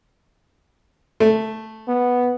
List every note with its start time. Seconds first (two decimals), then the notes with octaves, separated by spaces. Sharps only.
1.20 A3
1.88 B3